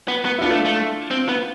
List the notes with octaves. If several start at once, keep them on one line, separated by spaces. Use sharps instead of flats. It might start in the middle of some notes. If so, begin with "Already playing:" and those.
B3
B3
E4
B3 D4 F4
A3
A3
C4
B3